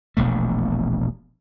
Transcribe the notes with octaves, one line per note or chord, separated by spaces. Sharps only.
E1 A#1 B2 A3